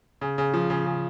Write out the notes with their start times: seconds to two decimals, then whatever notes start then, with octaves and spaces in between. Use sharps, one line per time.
0.21 C#3
0.38 C#3
0.54 F3
0.70 C#3
0.86 C#3